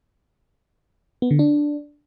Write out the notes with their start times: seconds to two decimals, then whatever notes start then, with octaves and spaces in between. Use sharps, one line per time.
1.22 B3
1.31 D3
1.39 D4